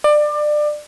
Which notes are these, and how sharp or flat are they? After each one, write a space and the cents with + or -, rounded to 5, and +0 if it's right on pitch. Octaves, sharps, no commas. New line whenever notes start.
D5 +25